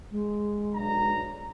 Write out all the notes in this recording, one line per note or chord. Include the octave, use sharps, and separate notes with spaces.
G#3
B1 D4 A#5